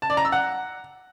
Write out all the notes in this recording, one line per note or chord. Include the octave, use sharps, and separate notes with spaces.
A5
D5
A#5
E6
F#5